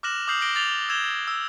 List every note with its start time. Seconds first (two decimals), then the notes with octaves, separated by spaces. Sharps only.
0.03 D6 F6 F#6 A#6 E7 F#7
0.27 D6 D#6 F6 G6 C7 F#7
0.41 D6 A#6 C7 D7 G7
0.55 D6 A6 F7 G7
0.89 E6 G6 G#6 E7 F7 G7
1.28 E6